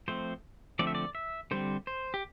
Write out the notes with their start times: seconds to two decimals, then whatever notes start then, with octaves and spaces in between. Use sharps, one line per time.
0.08 F3 A3 C4 C5
0.79 D3 F3 A3 C4 D5
0.87 E5
0.95 D5
1.15 E5
1.51 D3 G3 C4 C5
1.87 C5
2.14 G4